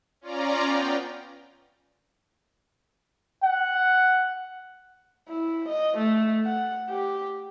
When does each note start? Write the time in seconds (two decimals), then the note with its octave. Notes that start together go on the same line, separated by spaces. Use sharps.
0.21 C#4 F4 D5 A#5
0.65 B3 G5
3.43 F#5
5.29 E4
5.69 D#5
5.98 A3
6.46 F#5
6.90 G4